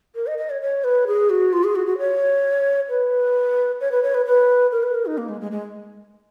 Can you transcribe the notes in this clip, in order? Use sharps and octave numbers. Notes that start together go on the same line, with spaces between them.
A#4
D#5
D#5
C#5
C#5
B4
G#4
F#4
F4
G#4
F#4
F#4
C#5
B4
C#5
B4
C#5
B4
B4
A#4
B4
A#4
D#4
A#3
G#3
G#3
G#3